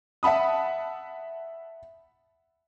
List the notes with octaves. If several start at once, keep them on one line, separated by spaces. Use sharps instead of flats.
E5 F#5 A5 B5 D#6